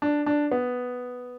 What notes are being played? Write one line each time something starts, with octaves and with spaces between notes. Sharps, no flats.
D4
D4
B3